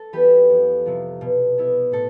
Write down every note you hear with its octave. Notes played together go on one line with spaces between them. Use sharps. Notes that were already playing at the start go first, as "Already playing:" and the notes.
Already playing: A4
E3 B3 G4 B4
F2
C3 F3
B2
B3 E4
A2 A4